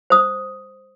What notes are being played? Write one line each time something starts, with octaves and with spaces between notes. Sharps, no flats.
C5 D#6